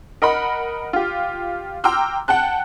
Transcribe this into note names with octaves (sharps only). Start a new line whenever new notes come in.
A#4 D#5 F#5 B5
F4 G4
G5 A#5 C6 D6 E6 F6
F#5 G5 A5 F#6